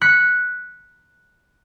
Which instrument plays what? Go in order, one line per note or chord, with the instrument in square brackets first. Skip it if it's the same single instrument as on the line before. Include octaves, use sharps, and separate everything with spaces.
[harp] F#6 B6 C#7